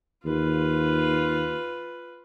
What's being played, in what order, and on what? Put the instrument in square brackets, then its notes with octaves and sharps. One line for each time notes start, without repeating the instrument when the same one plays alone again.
[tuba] D#2 [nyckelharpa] F4 B4